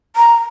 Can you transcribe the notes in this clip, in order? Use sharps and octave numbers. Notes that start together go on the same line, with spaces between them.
A#5